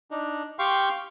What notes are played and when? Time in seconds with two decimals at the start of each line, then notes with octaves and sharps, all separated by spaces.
0.11 D4 D#4
0.59 G4 F5 G5 C6 C#6